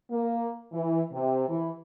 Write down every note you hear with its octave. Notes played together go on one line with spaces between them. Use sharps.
A#3
E3
C3
E3